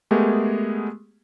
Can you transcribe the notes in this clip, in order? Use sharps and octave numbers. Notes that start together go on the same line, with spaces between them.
G#3 A3 B3 G4 G#4 A#4